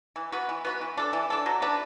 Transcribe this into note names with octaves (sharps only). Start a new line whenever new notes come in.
E3
B3 F#4 B4
E3
B3 F#4 B4
E3
D4 A4
E3
D4 A4
F#3
D4 B4